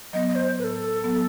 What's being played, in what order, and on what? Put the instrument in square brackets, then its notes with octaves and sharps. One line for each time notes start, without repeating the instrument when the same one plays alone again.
[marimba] F#3 B3 [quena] D#5
[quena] D#5
C5
[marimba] A2 [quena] B4
[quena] A4
[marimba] F#3 B3